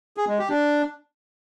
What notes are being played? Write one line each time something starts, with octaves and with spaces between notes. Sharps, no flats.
G#4
G#3
G4
D4